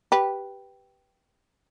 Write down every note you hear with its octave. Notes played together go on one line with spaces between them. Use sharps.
G4 B4